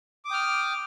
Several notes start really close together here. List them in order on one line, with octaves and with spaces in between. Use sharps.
D6 D#6 G5 F6